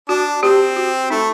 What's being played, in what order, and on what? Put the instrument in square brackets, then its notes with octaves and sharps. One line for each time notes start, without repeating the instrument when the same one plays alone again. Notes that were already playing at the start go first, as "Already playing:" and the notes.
[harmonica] D4 [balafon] F#4
[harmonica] C4 [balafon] G4
[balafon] F#4
[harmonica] A3 [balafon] D#4